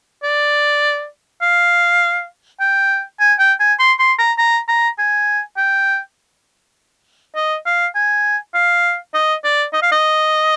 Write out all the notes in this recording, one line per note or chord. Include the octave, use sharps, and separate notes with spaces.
D5
F5
G5
G#5
G5
G#5
C6
C6
A#5
A#5
A#5
G#5
G5
D#5
F5
G#5
F5
D#5
D5
D#5
F5
D#5